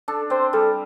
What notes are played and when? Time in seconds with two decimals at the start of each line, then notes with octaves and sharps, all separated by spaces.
0.08 D4 A4
0.30 C4 C5
0.53 G3 A4